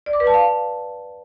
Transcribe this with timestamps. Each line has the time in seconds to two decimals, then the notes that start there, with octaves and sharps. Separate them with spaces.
0.06 D5
0.13 D6
0.20 B4
0.27 A5
0.34 F5